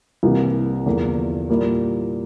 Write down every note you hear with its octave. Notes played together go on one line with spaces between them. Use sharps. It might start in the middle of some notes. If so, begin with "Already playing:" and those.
C2 C3 E3 A#3
E2 D3 F3 A#3
A#2 G3 A#3 E4